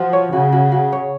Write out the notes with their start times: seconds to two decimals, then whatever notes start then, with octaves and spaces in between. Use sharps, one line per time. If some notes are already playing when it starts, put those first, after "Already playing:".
Already playing: F3 F#4
0.13 C#5
0.33 C#3 F#4
0.52 F#4
0.72 F#4
0.92 C#5